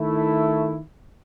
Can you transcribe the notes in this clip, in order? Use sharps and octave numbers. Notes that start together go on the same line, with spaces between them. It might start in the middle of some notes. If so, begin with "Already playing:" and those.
Already playing: D#3 A3 E4